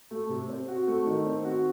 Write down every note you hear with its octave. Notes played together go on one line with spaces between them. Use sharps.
A3
C3
C4
F#4
A3
D#3
C4
F#4